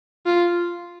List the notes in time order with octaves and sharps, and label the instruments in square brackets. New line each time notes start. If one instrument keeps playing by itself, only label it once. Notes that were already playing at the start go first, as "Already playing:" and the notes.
[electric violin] F4